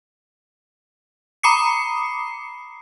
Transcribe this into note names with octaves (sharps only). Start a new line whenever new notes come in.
A#5 B5 D6 D#6 C7 C#7